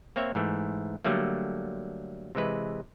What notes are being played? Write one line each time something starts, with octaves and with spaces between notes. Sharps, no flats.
A#3 C4 C#5 E5
G#2 E3 A3
D3 F#3 G3 A3 A#3
C3 E3 G#3 B4